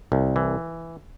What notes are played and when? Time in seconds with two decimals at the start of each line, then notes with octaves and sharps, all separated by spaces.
0.12 C2
0.36 E3